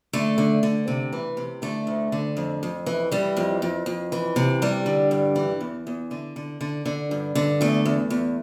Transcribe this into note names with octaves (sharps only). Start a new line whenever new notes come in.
D3 A3
D3
D3
C3
E3
C3
D3 A3
D2
D3
F2
F2
E3
E3 G3
F2
F2
F2
E3
C3
G2 G3
D3
G2
E3
E2
E2
D3
D3
D3
D3
G2
D3
E2 A3
E2
E2